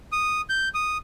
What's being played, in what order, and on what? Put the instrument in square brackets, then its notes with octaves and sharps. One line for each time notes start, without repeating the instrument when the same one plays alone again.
[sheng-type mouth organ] D#6
G6
D#6